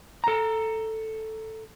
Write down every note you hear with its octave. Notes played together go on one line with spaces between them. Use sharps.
A4 A#5